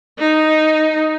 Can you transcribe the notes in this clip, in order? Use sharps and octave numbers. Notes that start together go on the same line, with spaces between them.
D#4